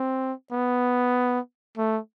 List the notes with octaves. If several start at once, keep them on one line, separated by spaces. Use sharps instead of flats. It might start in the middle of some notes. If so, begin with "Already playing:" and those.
Already playing: C4
B3
A3